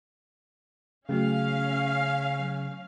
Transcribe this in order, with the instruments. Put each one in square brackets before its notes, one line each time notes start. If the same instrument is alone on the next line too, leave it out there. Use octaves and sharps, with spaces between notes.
[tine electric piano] C#3 [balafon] F#3 A3 F#4 [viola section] C#4 F5
[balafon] F#3